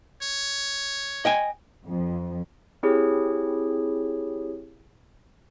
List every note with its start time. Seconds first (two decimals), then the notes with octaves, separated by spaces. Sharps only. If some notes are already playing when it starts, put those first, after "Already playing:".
0.22 C#5
1.25 D#5 G5 G#5
1.87 F2
2.83 C4 E4 G4 G#4 C#5